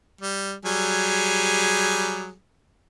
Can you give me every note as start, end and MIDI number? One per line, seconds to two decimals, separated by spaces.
0.21 0.54 55
0.65 2.33 54
0.65 2.33 55
0.65 2.33 68